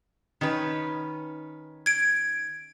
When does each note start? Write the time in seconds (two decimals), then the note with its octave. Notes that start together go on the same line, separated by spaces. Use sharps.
0.41 D#3 C#4 B4
1.86 G#6 D7